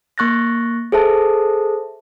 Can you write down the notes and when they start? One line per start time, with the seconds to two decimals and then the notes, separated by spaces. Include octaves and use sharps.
0.18 A#3 C#6 F#6 A6 A#6
0.92 G#4 A4 C5 E5 A5